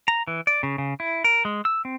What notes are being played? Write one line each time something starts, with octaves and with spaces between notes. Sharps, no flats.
A#5
E3
D5
C#3
C#3
E4
A#4
G#3
E6
C4